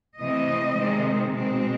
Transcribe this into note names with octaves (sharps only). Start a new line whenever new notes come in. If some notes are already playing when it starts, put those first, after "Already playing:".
C3 E3 A3 C4 D#5
C3 D#3 G#3 C4
B2 G#3 C4